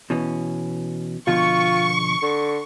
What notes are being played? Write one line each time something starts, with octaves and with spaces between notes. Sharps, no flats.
B2 E3 C#4
B2 D3 F3 F4 C#6
D3